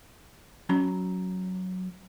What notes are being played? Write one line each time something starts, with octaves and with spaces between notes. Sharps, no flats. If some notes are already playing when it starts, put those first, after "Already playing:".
F#3 C#4 A#5 B5